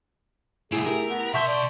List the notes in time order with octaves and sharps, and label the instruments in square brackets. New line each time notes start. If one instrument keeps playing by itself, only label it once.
[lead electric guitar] C2 A2 [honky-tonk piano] E4 D7 E7 [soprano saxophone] G#4
[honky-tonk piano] A3 E4 G4 [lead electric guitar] A#4
[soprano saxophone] B3
[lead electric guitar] B2 C6 [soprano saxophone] E5 [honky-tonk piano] A5 C#6 G6
[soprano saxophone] D5